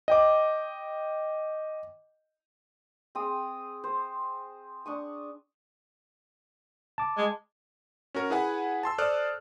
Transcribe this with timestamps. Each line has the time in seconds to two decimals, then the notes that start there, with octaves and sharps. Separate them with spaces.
0.08 D#5 G5 D6
3.15 C4 G#4 G5 D#6
3.84 C5
4.86 D4 C#6 D#6
6.98 A5 D6
7.17 G#3
8.15 C#4 F#4 A#4
8.30 E4 G#4 B4 F#5 G#5
8.83 A5 C6 E6
8.98 A4 C5 D5 D#6 F6 F#6